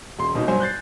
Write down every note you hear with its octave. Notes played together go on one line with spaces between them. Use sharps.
E1 C6
D#1 B2 D#4
G2 F#3 C5 G#5
F#6 G6 A6 C7